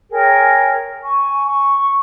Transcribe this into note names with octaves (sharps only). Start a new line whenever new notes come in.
G#4 A#4 C#5 G5
G#5 C#6
C#6